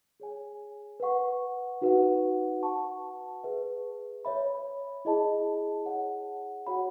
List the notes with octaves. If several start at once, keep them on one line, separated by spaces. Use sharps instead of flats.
G#4 C#5 G#5
B4 F#5 C#6
D#4 F#4 B4 F#5
B4 F#5 A5 C#6
G#4 B4 E5
C#5 E5 B5
E4 G#4 D#5 A5
G#4 C#5 F#5
F#4 C#5 F#5 B5